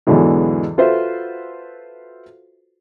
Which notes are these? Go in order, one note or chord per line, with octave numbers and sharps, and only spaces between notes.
E2 G#2 B2 D3 E3 F#3
F4 F#4 A4 B4 C5 E5